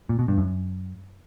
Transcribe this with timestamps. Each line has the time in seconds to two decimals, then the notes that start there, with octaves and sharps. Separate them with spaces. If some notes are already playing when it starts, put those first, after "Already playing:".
0.09 A#2
0.19 B2
0.28 G2
0.38 F#2